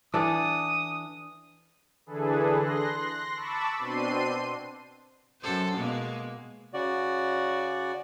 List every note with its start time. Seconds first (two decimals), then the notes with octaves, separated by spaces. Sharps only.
0.14 E3 D4 A4 D#6
2.06 D3 E3 D4 G#4 A4 B4
2.57 C6 F#6 A#6
3.35 A5 B5 C#6 D6 E6
3.78 B2 C4 D4 C6 C7 D#7
5.42 F#2 A4 C5
5.76 B2 G#3 A#3
6.74 C#3 F#4 D5